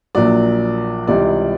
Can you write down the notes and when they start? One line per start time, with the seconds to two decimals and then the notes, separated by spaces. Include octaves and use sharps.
0.15 A#1 A#2 F#3 D5
1.08 C#2 C3 E3 G3 D5